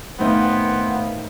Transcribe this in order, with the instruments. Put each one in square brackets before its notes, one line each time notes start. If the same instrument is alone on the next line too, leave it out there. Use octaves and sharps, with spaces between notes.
[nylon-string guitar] A2 D#3 D#4 [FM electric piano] A3 F5 [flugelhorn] B3 [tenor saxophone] C4